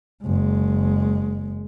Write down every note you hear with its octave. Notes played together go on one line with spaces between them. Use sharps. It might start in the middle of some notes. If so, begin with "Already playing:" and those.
F#1 G#3